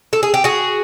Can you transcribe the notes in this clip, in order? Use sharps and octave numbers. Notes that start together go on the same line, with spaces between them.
A4
G#4
G4
F#4 G#4